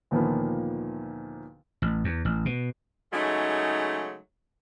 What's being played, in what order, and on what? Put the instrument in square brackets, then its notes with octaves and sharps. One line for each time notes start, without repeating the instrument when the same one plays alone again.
[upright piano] D2 A#2 D#3 F3 A#3 B3
[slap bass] A1
E2
A1
B2
[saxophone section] C#3 F#3 G#3 A3 D#4